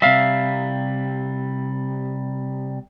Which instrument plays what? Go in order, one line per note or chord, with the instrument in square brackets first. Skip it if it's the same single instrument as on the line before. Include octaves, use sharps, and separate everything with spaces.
[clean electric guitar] C3 G3 [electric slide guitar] E5 F5